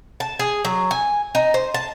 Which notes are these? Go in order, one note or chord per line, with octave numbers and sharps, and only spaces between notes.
A5
G#4
F#3
G#5
D#4
C5
A5